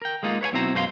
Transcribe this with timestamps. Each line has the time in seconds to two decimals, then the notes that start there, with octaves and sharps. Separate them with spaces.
0.02 A#4 G5
0.23 G#3 A#3 D#4 F4
0.41 B4 C#5 F5 G#5
0.53 B1 C4 E4 F#4 C5 A#5
0.74 F#2 B2 G#3 C5 F5 C6